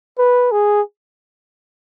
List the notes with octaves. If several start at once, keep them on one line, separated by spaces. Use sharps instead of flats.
B4
G#4